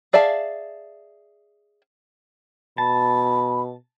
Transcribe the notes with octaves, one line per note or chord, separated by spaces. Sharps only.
G#4 D5 E5 F5 A5
B2 A5 B5